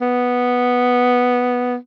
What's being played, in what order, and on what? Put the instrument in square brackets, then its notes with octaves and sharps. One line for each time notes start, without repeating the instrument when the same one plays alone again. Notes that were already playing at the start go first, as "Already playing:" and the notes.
[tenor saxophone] B3